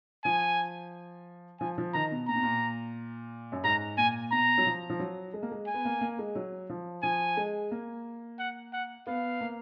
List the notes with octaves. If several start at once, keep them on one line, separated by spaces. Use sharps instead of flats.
F3 G#5
F3 G#5
F3
D#3 A#5
B2
A#2 A#5
B2
A#2
F#2
G#2 A#5
A#2 G#5
B2 A#5
F#3
F3
F3
F#3
G#3
A#3
G#3
G#5
B3
A#3
A#3
G#3
F#3
F3
F3 G#5
G#3
A#3
F#5
F#5
B3 F5
A#3